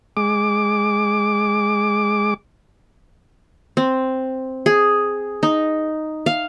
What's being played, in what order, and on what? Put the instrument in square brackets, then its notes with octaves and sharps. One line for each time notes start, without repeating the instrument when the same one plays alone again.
[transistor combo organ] G#3 D6
[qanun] C4
G#4
D#4
F5